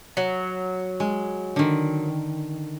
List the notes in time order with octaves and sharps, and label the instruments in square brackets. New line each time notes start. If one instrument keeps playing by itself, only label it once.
[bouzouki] F#3
[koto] G#3
D3 D#3